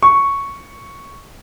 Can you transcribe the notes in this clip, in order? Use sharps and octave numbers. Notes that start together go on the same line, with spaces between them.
C#6